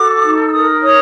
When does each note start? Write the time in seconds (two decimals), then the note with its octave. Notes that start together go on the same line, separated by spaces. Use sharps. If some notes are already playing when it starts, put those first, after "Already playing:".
Already playing: F#4 A4 D6
0.23 D#4
0.48 E6
0.52 A#4 D#6
0.82 C#5 D#6